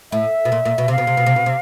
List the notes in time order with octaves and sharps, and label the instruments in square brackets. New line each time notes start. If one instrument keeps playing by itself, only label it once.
[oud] A2 [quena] E5
[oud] B2
A#2
A#2
B2
[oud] C3 [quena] F5
[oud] B2
C3
B2
C3
B2
C3